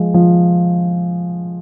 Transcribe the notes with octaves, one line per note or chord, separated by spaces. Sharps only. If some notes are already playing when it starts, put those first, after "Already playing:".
Already playing: F3 G#3
F3